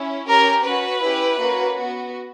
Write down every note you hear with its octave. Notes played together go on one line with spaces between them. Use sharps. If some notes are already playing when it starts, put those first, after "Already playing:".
Already playing: C#4 E4
C#4 G4 A#4
C#4 F#4 B4
C#4 E4 G4
A#3 C#4 F#4
B3 F#4